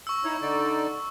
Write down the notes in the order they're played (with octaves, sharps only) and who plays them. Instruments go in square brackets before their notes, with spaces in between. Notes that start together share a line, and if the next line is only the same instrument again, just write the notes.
[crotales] C#6 E6
[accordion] D#4 E4 C#5
D3 D#4 D5